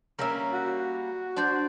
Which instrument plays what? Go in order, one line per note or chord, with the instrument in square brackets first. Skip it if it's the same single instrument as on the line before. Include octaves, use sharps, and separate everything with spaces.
[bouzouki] G3 A#3 C#4 [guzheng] A#4 E5
[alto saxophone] F#4
[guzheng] D4 C5 D5